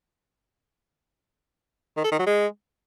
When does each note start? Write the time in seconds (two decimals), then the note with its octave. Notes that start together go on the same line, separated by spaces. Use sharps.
1.97 D#3
2.04 A4
2.11 D#3
2.19 F#3
2.26 G#3